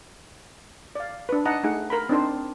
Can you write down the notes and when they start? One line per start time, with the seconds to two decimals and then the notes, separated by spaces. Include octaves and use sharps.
0.95 D5 F5
1.29 D4 B4
1.45 D#4 D#5 F#5 A5 A#5
1.64 A3 D#4 G#4 F#5
1.90 A#4 A#5 B5
2.09 C4 D4 D#4 C5